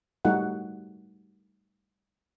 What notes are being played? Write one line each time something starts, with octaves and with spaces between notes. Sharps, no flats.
G3 A3 D#4 F#4 F#5